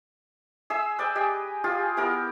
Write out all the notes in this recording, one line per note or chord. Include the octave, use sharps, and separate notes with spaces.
G#4 E5 E6
B4 D5 G5 G#5
G4 G#4 D#5
F4 G4 G#4
B3 E4 G4 A#4